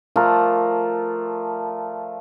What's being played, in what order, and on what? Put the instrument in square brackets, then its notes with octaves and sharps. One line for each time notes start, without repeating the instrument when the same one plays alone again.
[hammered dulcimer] F3 A3 A#4 D5